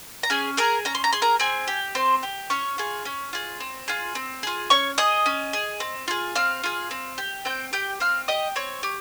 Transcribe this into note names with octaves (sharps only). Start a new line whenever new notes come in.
A#5
C#4 G#4 G#5
G#4 A#4 A#5
C#4 A#5
C6
A#5
G#4 C6
A#4 A#5
C4 G#4 G#5
G4
C4 C5 C6
G4
C#4 C#5 C#6
F4 G#4
C#4
F4 G#4
C4
F4 G#4
C4
F4 G#4
C#4 C#5 C#6
G#4 D#5 D#6
C#4
G#4
C4
F4 G#4
C4 F5 F6
F4 G#4
C4
G4
C4 G5 G6
G4 G5 G6
C4 F5 F6
G4 D#5 D#6
C4 C#5 C#6
G4